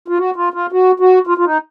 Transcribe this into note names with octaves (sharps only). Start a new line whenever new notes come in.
F4
F#4
F4
F4
F#4
F#4
F4
F4
D#4